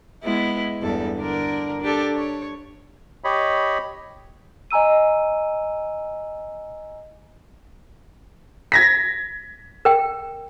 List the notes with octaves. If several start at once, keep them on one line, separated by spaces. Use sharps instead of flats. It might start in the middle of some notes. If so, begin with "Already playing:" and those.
G#3 B3 E4
E2 G2 A4
D3 D4 A#4
D4 G4 A4
C#5
G4 C#5 D#5 B5
D#5 G#5 A#5 E6 D#7
G#6 A#6 B6
A#4 G5